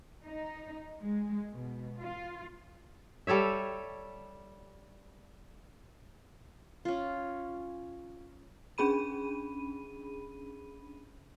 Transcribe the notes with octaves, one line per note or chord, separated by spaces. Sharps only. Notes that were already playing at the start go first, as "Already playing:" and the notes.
D#4
G#3
B2
F4
G3 A4 C#5 E5
C#4 F4
C#4 D4 G#4 B5 D#7